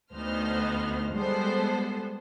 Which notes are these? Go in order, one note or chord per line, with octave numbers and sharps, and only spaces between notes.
D2 B3 D#4 C5 F6
G3 G#3 B3 A4 C5